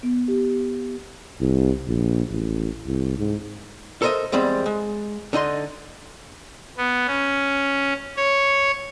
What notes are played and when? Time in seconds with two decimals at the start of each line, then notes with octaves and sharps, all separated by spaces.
0.03 B3
0.28 G4
1.40 C2
1.88 A#1
2.31 A1
2.87 C2
3.18 G#2
4.02 A4 A#4 C5 C#5 D#5 E5
4.32 E2 G3 G#3 C4 B5
4.66 G#3
5.33 D3 D#4 D#5 C6
6.78 B3
7.07 C#4
8.17 C#5